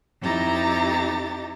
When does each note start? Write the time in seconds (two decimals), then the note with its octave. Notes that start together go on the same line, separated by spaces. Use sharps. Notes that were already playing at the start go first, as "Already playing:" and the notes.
0.21 F2 D#4 E4 G4 A#5 A6